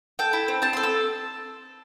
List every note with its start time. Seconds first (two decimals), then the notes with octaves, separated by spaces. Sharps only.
0.19 A4 G5
0.33 E4
0.48 C4
0.62 C4 A5
0.73 A4 C6
0.83 E6